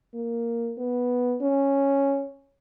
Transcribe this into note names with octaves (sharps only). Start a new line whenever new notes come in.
A#3
B3
C#4